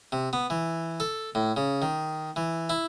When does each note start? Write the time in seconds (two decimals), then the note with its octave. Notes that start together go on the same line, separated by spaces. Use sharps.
0.12 C3
0.33 B3
0.50 E3
1.00 A4
1.35 A2
1.57 C#3
1.82 D#3
2.36 E3
2.70 E4